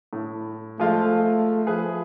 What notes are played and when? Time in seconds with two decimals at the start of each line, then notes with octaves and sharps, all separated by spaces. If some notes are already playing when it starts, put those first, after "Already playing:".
0.13 A2
0.80 F3 G#3 A3 F4
1.67 F3 G#4 B4